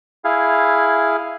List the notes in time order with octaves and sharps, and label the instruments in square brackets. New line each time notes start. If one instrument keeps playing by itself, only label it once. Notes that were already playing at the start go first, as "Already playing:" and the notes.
[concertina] E4 G#4 F5